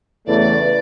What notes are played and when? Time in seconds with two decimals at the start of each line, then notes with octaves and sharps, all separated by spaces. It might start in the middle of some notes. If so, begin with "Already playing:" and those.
0.26 E2 C#3 E3 A3 D5